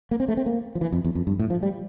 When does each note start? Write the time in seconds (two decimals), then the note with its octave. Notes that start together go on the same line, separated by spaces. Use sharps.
0.11 A#3
0.20 C4
0.28 A3
0.37 C4
0.46 A#3
0.75 F3
0.81 E3
0.92 F2
1.04 E2
1.15 F2
1.27 G2
1.39 A2
1.50 F3
1.63 G3